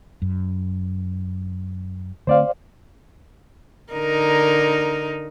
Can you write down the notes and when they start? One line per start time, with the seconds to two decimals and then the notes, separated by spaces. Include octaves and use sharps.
0.22 F#2
2.27 D3 A3 C4 C5 D5 F5
3.93 D3 D#4 A#4